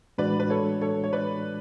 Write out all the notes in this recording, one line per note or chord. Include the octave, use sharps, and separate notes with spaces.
A2 E3 G#3 D4 F#4 B4 D5
B4
A4 C#5
A4 C#5
C#5
B4 D5